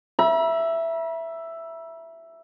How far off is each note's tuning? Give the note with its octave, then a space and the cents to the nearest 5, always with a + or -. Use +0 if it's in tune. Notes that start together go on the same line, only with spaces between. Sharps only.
E5 +5 B5 -45